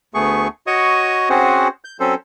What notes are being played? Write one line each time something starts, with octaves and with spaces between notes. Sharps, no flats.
D2 A3 B3 G#4 C#6
F#4 C#5 D#5 C#6 D#6
C4 C#4 F#4 G#4 C5 F#5
G6
F#3 C4 C#4 A4 C5